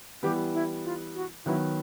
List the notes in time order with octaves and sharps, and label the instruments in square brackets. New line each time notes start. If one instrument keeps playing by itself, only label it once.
[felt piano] E3 G3 B3 [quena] G4
[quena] E4
F4
F#4
[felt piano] D#3 F#3 B3 [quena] E4